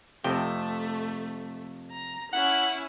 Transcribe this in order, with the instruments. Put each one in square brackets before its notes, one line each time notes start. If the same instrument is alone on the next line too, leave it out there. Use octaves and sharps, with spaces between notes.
[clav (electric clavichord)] F2 C3 G5 [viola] A3
[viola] A#5
[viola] C#4 E4 [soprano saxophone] F#5